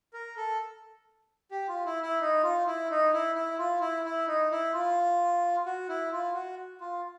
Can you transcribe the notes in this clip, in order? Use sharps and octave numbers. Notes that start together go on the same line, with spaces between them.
A#4
A4
G4
F4
E4
E4
D#4
F4
E4
D#4
E4
E4
F4
E4
E4
D#4
E4
F4
F#4
E4
F4
F#4
F4